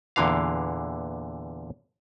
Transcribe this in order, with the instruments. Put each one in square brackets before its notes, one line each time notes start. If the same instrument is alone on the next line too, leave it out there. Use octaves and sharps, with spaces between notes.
[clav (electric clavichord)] E2 A#2 D3 E3 F5